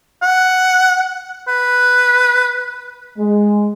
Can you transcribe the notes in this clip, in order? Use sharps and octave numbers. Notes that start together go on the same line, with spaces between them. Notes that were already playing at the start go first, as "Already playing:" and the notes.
F#5
B4
G#3